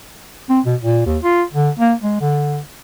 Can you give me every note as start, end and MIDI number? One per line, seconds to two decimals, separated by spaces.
0.50 0.60 60
0.66 0.75 47
0.81 1.05 46
1.06 1.18 39
1.23 1.43 65
1.54 1.70 50
1.80 1.94 58
2.03 2.16 56
2.21 2.59 50